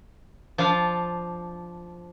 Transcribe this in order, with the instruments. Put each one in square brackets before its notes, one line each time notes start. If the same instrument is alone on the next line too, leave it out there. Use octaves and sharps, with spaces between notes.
[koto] F3 D4 F4